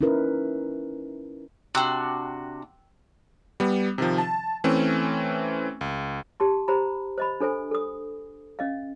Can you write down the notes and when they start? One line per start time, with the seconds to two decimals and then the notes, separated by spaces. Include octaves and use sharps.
0.01 C#4 D#4 E4 A#4 B4
1.75 C3 D4 F#4 G5 E6 F#6
3.60 G3 B3
3.98 C3 D#3 F3
4.18 A5
4.64 E3 A3 C4 C#4
5.81 C#2
6.40 G4 A5 C6
6.68 G4 C5 A#5 B5
7.18 C5 D#5 B5
7.40 D4 A4 C5 G#5
7.71 A4 D#6
8.59 C#4 D#5 F5